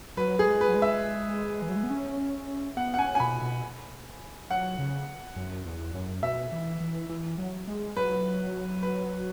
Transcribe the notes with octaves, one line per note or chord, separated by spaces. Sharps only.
F#3 B4
G#4
G#3
B4
F#3
G#3
E5
E3
F#3
G#3
B3
C#4
B3 F#5
F#5
C#4 G#5
G#5
B2 B5
B2
F#3 F#5
C#3
F#2
E2
F#2
B2 E5
E3
E3
E3
F#3
G#3
F#3 B4
B4